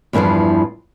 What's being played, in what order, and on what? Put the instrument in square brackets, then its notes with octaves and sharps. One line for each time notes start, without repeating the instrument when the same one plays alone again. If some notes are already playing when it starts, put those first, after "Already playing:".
[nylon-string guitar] E2 G2 D3 E3 F3